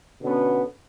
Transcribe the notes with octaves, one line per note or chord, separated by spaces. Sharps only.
B2 D3 B3 C#4